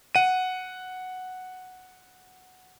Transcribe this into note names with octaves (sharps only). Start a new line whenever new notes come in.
F#5 D#7